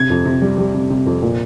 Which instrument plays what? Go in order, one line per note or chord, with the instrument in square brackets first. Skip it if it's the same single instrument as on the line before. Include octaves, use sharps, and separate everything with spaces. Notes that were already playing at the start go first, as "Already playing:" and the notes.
Already playing: [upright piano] C3 G#6
F2
C3
G3
G3
C3
C3
F2
A#2